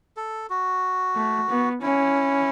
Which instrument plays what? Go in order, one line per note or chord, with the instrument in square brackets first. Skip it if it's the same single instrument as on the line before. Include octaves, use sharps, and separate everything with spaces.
[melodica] A4
F#4
[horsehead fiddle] A3
B3
[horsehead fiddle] C#4 [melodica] E4